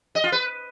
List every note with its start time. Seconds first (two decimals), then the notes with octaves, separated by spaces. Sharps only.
0.15 D#5
0.24 F4
0.32 B4